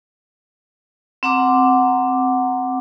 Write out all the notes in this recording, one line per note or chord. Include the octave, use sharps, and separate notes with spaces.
C4 F#5 A#5 D6